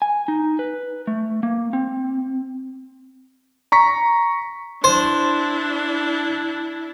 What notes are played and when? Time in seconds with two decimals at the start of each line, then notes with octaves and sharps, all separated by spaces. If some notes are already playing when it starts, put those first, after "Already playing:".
0.02 G#5
0.28 D#4
0.59 B4
1.07 A3
1.43 A#3
1.73 C4
3.72 A#5 C#6 B6
4.84 D4 E4 C5